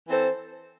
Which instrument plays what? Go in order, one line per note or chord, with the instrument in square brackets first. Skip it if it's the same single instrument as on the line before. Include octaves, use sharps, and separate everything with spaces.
[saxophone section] E3 C4 A4 C5